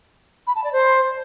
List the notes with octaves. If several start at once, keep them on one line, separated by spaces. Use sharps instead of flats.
B5
A5
D5
C5